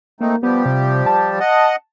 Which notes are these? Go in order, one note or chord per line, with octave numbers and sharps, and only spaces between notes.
A3 A#3 C4 D#4
F3 G3 B3 G4
C3
A5
D#5 F#5